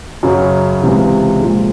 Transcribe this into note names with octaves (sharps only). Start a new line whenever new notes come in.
F#2 C#3 F#3
C#2 C3 E3
A#2 F3 G#3